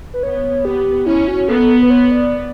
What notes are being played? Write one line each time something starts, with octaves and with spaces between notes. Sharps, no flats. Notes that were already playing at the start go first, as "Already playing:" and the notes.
B4
B3 C#5
B3 G4
C#4 E4
F#4
B3 A4
B4
C#5
D5